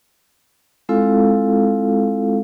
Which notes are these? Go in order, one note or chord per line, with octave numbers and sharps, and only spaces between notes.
G#3 C4 E4 F4 A4 F5